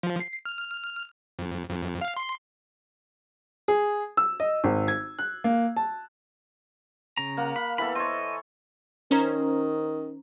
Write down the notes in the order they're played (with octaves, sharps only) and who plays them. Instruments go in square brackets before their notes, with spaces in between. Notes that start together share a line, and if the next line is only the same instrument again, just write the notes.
[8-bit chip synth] F3
C7
F6
F2
F2
F5
C6
[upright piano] G#4
E6
D#5
G#1
G#6
F#6
A#3
A5
[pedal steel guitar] C#3 A#5
[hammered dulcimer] A#3 F5 F#5
[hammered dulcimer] F5 [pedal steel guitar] B5
[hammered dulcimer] E3 B3 A4 [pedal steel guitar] B5
[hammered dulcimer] C5 C#5 [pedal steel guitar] D#5
[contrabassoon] D#3 [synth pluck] C#4 C5 A#5